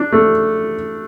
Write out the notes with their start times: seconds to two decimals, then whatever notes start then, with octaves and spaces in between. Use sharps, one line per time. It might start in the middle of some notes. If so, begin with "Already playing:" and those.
Already playing: D4
0.12 A3